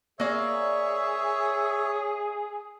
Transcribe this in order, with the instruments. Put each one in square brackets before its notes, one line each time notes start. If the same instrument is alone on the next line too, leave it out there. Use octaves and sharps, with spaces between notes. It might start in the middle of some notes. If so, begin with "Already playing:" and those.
[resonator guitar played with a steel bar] A#3 D5 [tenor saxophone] G#4 [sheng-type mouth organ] C#5 [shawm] E5